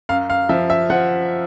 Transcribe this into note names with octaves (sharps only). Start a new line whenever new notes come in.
F#2 F5
F5
F3 E5
E5
F3 F#5